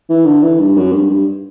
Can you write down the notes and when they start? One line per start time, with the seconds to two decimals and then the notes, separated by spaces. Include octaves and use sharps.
0.09 E3
0.26 D3
0.43 E3
0.59 G2
0.77 F#2
0.92 G2
1.10 G2